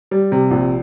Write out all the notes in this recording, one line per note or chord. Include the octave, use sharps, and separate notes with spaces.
G3
C3
A#1